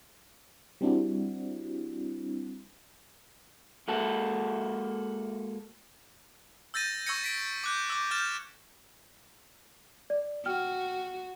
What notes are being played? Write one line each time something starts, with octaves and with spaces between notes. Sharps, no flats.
G3 C4 D4 E4 F#4
G#3 A#3 F#4 A4
E6 G6 A6 A#6 D#7
C#6 E6 G6 G#6 A#6 C#7
B6 D7
D6 F#6 G6
D6 E6
F6 G6 A6 E7
D5
F#4 G5 F6